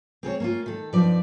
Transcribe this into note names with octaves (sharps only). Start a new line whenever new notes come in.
C4 G#4 A4 C#5
A#3 C#4 F4
D#3 A4
G2 F3 C4 D#4 B4 D5